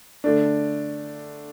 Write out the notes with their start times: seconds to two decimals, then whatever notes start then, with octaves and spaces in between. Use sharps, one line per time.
0.24 D3 A3 D4